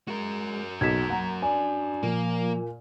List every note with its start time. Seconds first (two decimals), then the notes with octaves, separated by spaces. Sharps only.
0.08 G#3 F#4 A#4
0.81 B1 F#3 A#3 G#6 B6 E7
1.10 F#3 A#3 F#5 A#5
1.42 D4 D5 G#5
2.03 A#2 F3 A#3